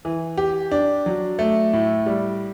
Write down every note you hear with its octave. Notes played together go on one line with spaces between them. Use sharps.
E3
G4
D4
F#3
A3
A2
G3